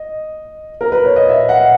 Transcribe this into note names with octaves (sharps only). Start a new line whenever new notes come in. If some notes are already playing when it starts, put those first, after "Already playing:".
Already playing: D#5
A#4
B4
C#5
D#5
E5
F#5